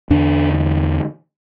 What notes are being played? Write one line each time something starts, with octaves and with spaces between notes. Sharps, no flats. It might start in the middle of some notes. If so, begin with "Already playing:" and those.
E2 D3 D4